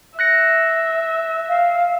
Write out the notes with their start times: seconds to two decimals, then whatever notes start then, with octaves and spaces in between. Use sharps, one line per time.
0.19 E5 F#6 A#6 C#7
1.49 F5